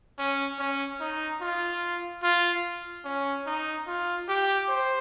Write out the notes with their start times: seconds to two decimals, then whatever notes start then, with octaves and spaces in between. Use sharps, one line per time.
0.19 C#4
0.59 C#4
1.00 D#4
1.42 F4
2.23 F4
3.05 C#4
3.46 D#4
3.87 F4
4.29 G4
4.70 C5